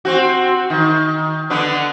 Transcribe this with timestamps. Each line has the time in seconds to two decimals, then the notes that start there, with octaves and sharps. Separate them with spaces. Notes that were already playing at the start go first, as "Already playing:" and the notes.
0.05 C4 F#4
0.70 D#3
1.50 D3 B3 D4